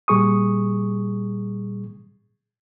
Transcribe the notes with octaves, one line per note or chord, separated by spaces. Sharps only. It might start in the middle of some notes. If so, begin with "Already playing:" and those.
A#2 G3 G#4 C#6 D#6